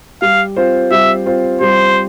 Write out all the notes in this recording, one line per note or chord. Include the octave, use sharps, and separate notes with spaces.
G3 F5
C4 F4 C5
G3 E5
C4 F4 C5
G3 C5